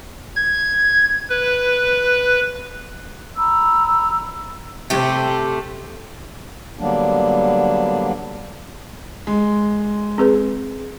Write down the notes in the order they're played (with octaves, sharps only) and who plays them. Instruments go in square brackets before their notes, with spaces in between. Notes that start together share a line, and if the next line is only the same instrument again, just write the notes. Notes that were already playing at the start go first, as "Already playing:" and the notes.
[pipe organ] G#6
B4
[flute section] A#5 B5 E6
[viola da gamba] C3 [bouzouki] A3 G4
[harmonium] D3 F#3 G3 A#3 B3 D4
[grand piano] G#3
[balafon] C4 G#4 B4